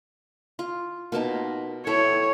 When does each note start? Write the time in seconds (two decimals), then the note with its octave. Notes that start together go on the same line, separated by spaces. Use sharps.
0.59 F4
1.12 B2 A#3 D#4 F4 A5
1.87 E4 A4 C#5 G5